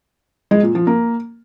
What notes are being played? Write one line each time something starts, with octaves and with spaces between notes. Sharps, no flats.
G#3
A#2
F3
A#3